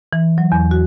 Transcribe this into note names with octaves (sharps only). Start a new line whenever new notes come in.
E3
F#3
E2
F#4